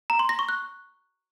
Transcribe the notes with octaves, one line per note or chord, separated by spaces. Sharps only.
A#5
C6
A#6
C#6
F#6